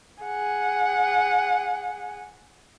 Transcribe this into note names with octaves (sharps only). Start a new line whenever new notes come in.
G#4 F#5